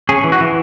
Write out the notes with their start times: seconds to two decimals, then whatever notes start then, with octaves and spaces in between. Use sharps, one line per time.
0.09 C#4 G#4
0.24 E3
0.32 F#4
0.41 E3